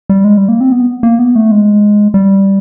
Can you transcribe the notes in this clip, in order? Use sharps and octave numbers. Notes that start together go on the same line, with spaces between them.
G3
G#3
G3
A#3
C4
B3
A#3
B3
A3
G#3
G3